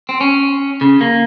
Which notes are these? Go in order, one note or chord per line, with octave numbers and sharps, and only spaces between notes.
C4
C#4
C#3
A#3